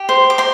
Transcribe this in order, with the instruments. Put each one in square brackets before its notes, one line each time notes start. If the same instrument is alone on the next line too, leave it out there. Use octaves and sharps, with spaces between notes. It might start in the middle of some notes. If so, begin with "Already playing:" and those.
Already playing: [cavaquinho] G4
C5
D6
C5 C6